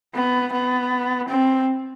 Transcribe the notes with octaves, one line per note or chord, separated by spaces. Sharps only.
B3
B3
C4